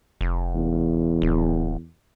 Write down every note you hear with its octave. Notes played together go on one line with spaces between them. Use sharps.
F1
E2
D1